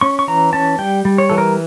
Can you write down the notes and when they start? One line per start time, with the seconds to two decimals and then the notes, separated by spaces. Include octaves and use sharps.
0.01 C#4 C#6
0.19 C#6
0.28 E3 A#5
0.53 C#4 A5
0.78 G3 G5
1.05 G3
1.18 C#5
1.30 E3 A4
1.38 A#4